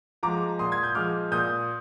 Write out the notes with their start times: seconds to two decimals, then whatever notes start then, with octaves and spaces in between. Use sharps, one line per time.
0.23 F3 G#3 A#5 D6
0.59 A#2 C6 D#6
0.72 G#6
0.83 G6
0.95 F3 G#3 D6 F6
1.32 A#2 D#6 G6